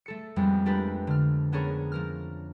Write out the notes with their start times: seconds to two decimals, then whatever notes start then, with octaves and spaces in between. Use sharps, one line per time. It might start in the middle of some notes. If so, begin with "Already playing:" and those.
0.06 A3 A4 C#7
0.36 F2 G3 G#3 B3
0.66 A3 B3 D4 G4 A#4 B4
1.07 D3 F6
1.52 B3 C#4 D4 G#4 A#4 C#5
1.92 F3 A#4 F6